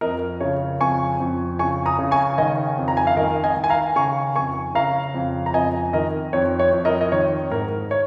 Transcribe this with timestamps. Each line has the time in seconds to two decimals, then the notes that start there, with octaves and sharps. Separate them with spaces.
0.01 F2 A#4 D#5
0.40 C#3 C#5
0.80 F2 G#5 C#6
1.20 F2
1.59 C#3 G#5 C#6
1.86 A#5 D#6
1.99 C#3
2.11 G#5 C#6
2.38 D#3 D#5 G#5
2.78 F2
2.88 A#5
2.97 G#5
3.07 F5
3.17 D#3 A#4 D#5
3.44 D#5 G#5
3.56 D#3
3.64 G#5
3.70 F5 A#5
3.96 C#3 G#5 C#6
4.36 F2 G#5 C#6
4.75 C#3 F5 A#5
5.14 F2
5.46 A#5
5.54 F2 D#5 G#5
5.93 D#3 A#4 D#5
6.33 F2 C#5
6.60 C#5
6.73 F2
6.85 A#4 D#5
7.01 D#5
7.12 D#3 C#5
7.51 G#2 A#4
7.91 C#5